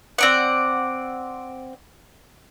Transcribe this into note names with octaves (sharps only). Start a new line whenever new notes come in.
C4 D5 F#5